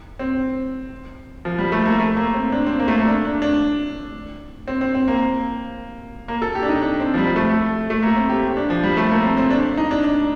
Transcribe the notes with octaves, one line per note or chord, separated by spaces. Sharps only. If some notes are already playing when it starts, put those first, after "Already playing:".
C4
F3
G3
A3
A#3
A3
A#3
C4
D4
C4
A#3
A3
A#3
D4
D4
D4
C4
C4
C4
A#3
A#3
A4
G4
D4
D#4
D4
C4
F3
G3
A3
A3
A#3
C4
G4
D4
F3
G3
A3
A#3
C4
C4
D4
D#4
D4
D4